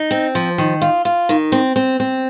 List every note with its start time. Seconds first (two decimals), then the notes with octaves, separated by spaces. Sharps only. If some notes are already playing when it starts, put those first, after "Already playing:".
Already playing: D#4
0.11 C4
0.35 F3
0.58 D#3
0.81 F4
1.05 F4
1.29 D#3
1.52 C4
1.76 C4
2.00 C4